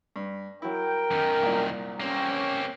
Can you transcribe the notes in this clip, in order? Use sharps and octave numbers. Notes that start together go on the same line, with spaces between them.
G2
F#3 E4 A#4 G5
F#2 D#3
C2 A#2
A#3 C4 C#4 G4 C#5 G5